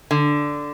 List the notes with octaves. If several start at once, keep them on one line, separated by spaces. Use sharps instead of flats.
D3